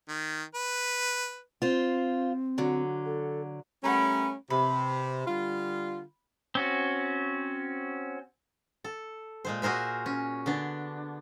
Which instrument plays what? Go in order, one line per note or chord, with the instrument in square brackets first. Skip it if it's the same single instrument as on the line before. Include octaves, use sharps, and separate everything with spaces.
[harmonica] D#3
B4
[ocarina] C4 [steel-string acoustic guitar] F4 C5
[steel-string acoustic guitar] D3 F#3
[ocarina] A4
[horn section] G3 A3 C#4 [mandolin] A#4 B4 F#5
[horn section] C3 [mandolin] B4
[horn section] D3 G3 F4
[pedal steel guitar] C4 C#4 F#4
[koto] A4
A#2 G#3 C5
F#4 G#4 A#4 C5 E5
C#4
D3 B3 D4